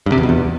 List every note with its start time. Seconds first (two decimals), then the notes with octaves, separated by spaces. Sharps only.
0.06 G2
0.12 C3
0.18 E2
0.23 B2
0.29 E2